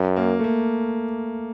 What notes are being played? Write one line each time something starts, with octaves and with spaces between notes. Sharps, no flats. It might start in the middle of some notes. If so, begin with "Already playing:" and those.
Already playing: F#2
A#3
A3
A#3